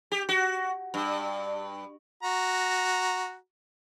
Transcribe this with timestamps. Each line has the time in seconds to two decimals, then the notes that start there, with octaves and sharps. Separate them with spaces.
0.12 G4
0.29 F#4
0.94 G2
2.23 F#4 A#5